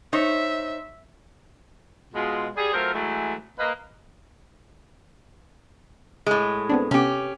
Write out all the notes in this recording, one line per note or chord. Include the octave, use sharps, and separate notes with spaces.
D#4 C5 C#5 E5
B2 G#3 F4
G3 G#4
F#3 A3 C4 F4 A#4 C5
E3 F#3 G#3 A3
A#3 B4 D#5
A2 G#3
B3 C4 D4
C3 B3 C#4 G4